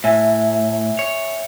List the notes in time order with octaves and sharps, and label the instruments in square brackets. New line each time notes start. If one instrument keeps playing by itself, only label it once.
[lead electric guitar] A2 [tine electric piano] E5 G#5
[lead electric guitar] C#5